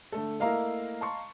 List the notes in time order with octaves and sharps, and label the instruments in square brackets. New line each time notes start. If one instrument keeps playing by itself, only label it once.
[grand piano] D3 A3 A4
[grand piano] A3 A#3 E4 [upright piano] D#5 F5 A#5
[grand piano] A5 C6 C#6